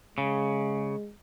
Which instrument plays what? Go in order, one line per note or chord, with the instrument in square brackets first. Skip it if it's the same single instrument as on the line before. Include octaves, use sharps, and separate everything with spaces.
[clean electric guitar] C#3 [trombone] G#3